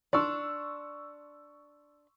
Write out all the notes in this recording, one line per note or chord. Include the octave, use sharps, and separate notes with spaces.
D4 D5 C6 C#6 E6